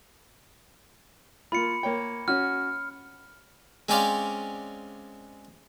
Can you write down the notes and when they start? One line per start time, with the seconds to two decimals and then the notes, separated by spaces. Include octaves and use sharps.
1.52 A#3 F4 B5 C#7
1.83 A#3 C#5 G5
2.28 C#4 F#4 F6
3.89 G#3 C4 C#4 C5 D5 F5